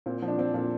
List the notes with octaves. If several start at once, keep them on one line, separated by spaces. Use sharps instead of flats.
A#2 C4
F3
D4
F3 C4
A#2 D4